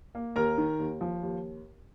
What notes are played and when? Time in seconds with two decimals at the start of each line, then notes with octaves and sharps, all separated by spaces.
0.15 A#3
0.36 D#2 A#4 A#5
0.58 D#3
0.79 D#2
1.01 F3
1.23 D#2